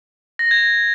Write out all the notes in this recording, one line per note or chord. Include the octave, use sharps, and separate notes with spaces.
A#6
G#6